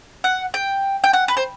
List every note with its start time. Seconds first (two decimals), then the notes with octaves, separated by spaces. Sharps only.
0.24 F#5
0.54 G5
1.04 G5
1.13 F#5
1.28 B4
1.37 C5